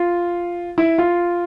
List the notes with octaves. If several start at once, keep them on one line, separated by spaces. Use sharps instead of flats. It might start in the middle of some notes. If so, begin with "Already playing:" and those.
Already playing: F4
E4
F4